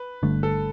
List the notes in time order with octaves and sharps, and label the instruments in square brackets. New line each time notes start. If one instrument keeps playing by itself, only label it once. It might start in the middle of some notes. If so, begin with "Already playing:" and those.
Already playing: [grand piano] B4
[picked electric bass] G1 G2 D3 A3
[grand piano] A4